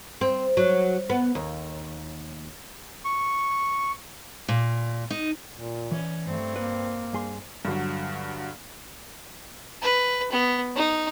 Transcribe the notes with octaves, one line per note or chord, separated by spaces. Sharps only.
C4
F#3
B3
D#2
C#6
A#2
D#4
A#2
E3 C#4 D5
G2 A3 C4
A#3 B4
G2 G#4 C6
G2 D3 F#3
B4
B3
D#4